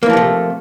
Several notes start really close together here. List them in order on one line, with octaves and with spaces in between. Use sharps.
A#3 E3 F3 C3 A3